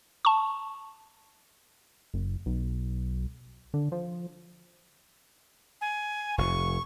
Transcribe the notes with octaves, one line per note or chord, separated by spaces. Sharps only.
A5 C#6
F#1
B1
D3
F3
G#5
F1 C#6